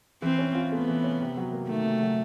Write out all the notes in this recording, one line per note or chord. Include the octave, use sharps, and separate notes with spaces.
E3 C4
C#4
F4
A3 B3
E3
C#4
C3
F#3
A#3
D#3 A3
C3
F#3